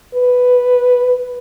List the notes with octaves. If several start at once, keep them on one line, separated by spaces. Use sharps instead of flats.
B4